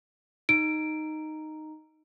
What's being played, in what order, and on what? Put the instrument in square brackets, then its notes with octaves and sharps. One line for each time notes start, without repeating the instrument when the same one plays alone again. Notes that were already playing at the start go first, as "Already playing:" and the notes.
[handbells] D#4 [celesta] D7